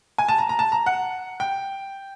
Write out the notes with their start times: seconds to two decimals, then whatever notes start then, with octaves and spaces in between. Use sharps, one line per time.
0.18 G#5
0.28 A5
0.38 A#5
0.49 A#5
0.59 A5
0.72 A#5
0.86 F#5
1.40 G5